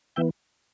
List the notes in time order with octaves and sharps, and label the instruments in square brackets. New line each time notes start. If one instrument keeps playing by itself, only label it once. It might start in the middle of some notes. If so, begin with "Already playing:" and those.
[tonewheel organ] E3 B3 E5 G5